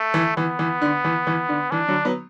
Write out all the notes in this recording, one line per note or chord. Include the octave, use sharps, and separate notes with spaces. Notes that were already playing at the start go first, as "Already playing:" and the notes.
Already playing: A3
E3
E3 B3
E3
D3
E3
E3
D3
E3 D4
D3 F#3
F#3 B3